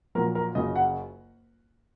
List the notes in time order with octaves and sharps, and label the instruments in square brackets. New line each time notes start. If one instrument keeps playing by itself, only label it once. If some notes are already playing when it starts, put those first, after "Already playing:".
[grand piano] A#1 A#2 F#3 A#4
A#4
F#1 F#2 C#3 F#3 D#5
F#5